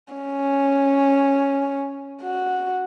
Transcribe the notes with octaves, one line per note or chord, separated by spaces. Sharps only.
C#4
F#4